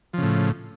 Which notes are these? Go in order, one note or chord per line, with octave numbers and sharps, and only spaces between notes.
A2 C#3 F3